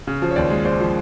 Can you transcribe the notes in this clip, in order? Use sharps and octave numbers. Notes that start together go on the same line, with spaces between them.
C#3
F3
C#5
D#2 C5 D5
G#3
C#3 C5 D5
F3